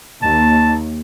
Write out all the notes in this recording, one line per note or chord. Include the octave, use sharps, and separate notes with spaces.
D#2 A5